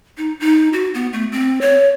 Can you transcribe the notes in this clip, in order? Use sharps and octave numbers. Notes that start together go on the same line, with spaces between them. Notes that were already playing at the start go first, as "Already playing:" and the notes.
D#4
D#4
F#4
B3
A3
C4
C#5